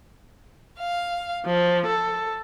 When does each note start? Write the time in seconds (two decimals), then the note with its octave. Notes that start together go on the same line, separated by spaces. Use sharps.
0.78 F5
1.46 F3
1.86 A4